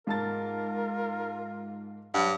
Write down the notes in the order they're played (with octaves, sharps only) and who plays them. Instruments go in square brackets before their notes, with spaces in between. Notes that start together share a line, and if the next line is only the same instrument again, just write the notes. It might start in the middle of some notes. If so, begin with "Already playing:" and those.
[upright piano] G#2 A5 A6 [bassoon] F4 [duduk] A#4
[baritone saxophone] G2 [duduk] F#3 [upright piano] F#5